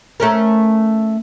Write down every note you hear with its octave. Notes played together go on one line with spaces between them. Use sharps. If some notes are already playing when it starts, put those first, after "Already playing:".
A3 C#4 A#4